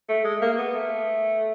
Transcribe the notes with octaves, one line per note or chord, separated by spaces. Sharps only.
A3
G#3
A#3
B3
A3